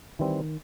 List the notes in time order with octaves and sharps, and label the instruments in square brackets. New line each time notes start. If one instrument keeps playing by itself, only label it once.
[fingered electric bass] D#3 [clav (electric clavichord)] E3 G3 C4